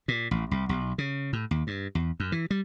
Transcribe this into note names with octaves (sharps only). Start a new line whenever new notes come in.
A#2
A1
C2
B1
C#3
A2
D#2
G2
E2
F#2
E3
G3